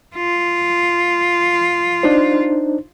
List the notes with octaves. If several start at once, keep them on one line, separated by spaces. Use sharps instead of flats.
F4
D4 D#4 C5